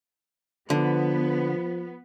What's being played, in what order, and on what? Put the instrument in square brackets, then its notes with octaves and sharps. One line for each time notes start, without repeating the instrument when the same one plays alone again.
[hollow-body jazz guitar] D3 [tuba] F3 [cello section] B3